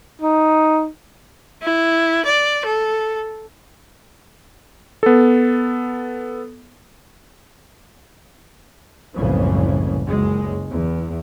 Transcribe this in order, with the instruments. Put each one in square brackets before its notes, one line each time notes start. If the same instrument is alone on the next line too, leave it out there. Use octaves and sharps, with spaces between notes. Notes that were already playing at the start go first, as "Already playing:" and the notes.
[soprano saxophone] D#4
[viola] E4
D5
A4
[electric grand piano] B3 A4
[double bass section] F#1 C2 A2 C#3 E3 F3
F#1 C#2 F#2 G#3
E2